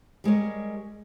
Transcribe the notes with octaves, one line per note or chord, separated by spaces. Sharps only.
G3 G#3 A#4 C#5